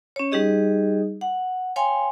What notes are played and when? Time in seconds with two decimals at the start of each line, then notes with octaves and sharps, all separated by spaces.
0.16 C#4 C#5
0.32 G3 D#4 G4 G#4 D#5
1.21 F#5
1.76 C#5 F5 G5 G#5 C6